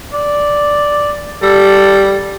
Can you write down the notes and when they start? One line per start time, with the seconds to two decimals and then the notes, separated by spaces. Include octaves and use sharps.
0.14 D5
1.43 G3 A4